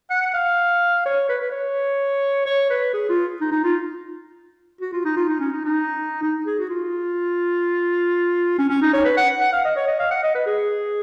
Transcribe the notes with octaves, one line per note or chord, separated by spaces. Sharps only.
F#5
F5
C#5
B4
B4
C#5
C#5
B4
G#4
F4
D#4
D#4
F4
F#4
F4
D#4
F4
D#4
C#4
D#4
D#4
D#4
G#4
F#4
F4
C#4
C#4
D#4
C#5
B4
F#5
F#5
F5
D#5
C#5
D#5
F5
F#5
D#5
B4
G#4